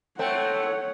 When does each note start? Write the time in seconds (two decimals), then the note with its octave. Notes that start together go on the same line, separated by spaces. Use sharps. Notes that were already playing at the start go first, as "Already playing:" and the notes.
0.19 A3 C4 C#5 F#5